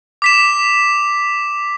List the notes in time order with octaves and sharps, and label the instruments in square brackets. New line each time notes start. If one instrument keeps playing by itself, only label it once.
[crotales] D6 B6 E7